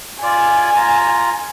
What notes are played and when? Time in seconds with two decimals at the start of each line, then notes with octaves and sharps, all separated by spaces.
0.23 F4 D5 G#5
0.76 F4 A#5